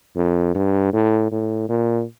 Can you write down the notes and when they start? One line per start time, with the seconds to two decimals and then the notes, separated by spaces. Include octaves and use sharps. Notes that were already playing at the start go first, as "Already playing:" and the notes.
0.17 F2
0.55 G2
0.93 A2
1.32 A2
1.69 A#2